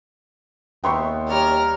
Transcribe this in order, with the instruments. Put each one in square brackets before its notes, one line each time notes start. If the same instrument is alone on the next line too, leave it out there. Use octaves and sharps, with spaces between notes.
[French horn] D#2 [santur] B3 D#4 E5 [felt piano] G5 C6 C#6
[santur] G3 C#5 D5 [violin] A#4 F6